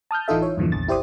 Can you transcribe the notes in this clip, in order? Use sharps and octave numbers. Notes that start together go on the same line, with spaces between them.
A5 D#6 F6 G6
A1 E3 D#4 F4 A4 E5
C#5
E2 G2 A#2 D3 E3 F3
A#1 E2 A6
G1 E4 G4 C5 D5 D#6